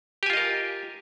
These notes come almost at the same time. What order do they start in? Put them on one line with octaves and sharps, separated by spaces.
G4 G#5 F4 D#5 A#4